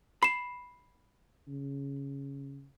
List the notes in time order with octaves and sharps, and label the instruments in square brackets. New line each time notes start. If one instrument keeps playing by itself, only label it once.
[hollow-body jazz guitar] B5 [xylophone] C7 E7
[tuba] C#3